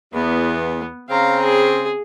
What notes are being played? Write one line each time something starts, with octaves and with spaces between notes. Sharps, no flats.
E2 B3
C#3 C4 F5 A#5
G#4